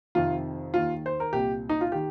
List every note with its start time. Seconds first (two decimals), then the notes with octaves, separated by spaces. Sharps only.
0.15 F2 C3 D#3 F4
0.74 D#2 D#3 F4
1.06 C5
1.20 A#4
1.33 C2 A#2 G4
1.69 D#4
1.81 F4
1.92 D#3 G4